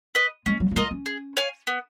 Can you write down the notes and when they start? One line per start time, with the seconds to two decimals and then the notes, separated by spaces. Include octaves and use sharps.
0.15 B4 D#5
0.46 G#3 C#4
0.60 F#3
0.71 F#3
0.76 G#3 F4 A#4 D#5
0.91 C#4
1.06 G#4
1.37 C#5 F5 G#5
1.67 B3